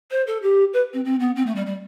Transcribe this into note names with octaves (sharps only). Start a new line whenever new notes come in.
C5
A4
G4
B4
C4
C4
B3
C4
A3
G3
G3